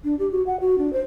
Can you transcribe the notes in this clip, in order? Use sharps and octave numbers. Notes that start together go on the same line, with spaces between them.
D4
G4
F#4
F#5
F#4
D4
C5